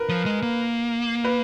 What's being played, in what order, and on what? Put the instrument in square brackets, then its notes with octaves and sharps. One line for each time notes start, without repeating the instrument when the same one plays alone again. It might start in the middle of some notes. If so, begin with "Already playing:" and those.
Already playing: [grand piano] A#4 B4
[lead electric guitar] F3
G#3
A#3
[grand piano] B4